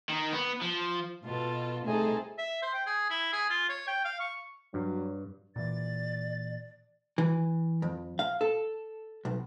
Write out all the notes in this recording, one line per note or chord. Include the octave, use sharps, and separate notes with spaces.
D#3
B3
F3
B2 F4 A4
C2 B2 A3 C4 D#4 G#4 A4
E5
C5
G5
G#4
E4
G#4
F4
C#5
G5
F5
C#6
G2 F#3
A#2 E3 D5 A6
E3
F2
F5
A4
B1